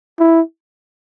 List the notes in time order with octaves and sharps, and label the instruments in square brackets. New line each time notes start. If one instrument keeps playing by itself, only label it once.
[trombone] E4